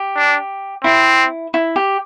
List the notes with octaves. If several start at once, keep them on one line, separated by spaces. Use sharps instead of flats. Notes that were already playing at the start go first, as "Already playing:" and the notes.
Already playing: G4
D4
C4 E4
E4
G4